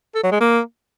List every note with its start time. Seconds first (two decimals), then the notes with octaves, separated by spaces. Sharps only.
0.15 A4
0.23 F#3
0.32 G#3
0.40 A#3